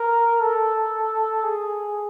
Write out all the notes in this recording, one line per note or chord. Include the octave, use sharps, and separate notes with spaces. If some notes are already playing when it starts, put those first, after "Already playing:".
Already playing: A#4
A4
G#4